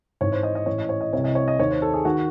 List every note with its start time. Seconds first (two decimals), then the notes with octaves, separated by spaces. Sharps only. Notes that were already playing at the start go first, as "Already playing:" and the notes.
0.21 G#1 G#2 E3 C#5
0.32 C5
0.43 D#5
0.55 D#5
0.66 A1 G#2 E3 C#5
0.78 D#5
0.89 C#5
1.01 D#5
1.13 C2 C3 E3 C#5
1.24 D#5
1.35 C#5
1.48 D#5
1.59 D#2 D#3 C#5
1.71 C5
1.82 A4
1.94 G#4
2.05 D#3 F#4